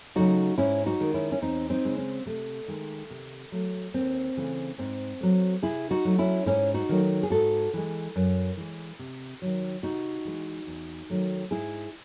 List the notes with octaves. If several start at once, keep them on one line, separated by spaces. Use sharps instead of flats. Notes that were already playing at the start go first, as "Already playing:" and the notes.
C#3 F#3 A3 D#4 F#4
G#2 C#4 E4
D#4 F#4
D#3 G#3
C#4 E4
C#4
E2 C4 D#4
C4 D#4
C#3 G#3
C4
C3 A3
D#3 G#3
C3
F#3 A3
D#2 C4
C#3 E3 A3
G#2 C4
F#3 A3
C3 E4 G#4
D#4 F#4
F#3 A3
C#4 E4
G#2 C#4 E4
D#4 F#4
D#3 F#3 A3
G#4
G#2 F#4 A4
E3 G#3
F#2
E3 G#3
C3
D#3 F#3
C3 D#4 F#4
E3 G#3
E2
D#3 F#3 A3
G#2 E4 G#4